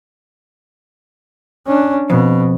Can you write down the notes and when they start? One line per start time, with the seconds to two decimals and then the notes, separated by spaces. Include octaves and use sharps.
1.67 C#4 D4
2.10 F2 B2